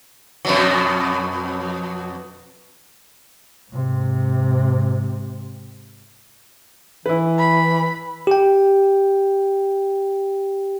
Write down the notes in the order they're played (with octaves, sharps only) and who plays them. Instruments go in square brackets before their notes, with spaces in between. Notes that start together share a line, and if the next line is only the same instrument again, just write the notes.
[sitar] F2 B2 F#3
[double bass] G#2 C3
[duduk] E3 [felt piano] E4 B4
[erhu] B5
[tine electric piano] G4 G5